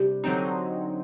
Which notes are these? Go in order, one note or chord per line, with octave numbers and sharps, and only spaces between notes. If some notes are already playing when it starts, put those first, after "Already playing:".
Already playing: C3 G3 D4 G4
D3 F#3 C4 D#4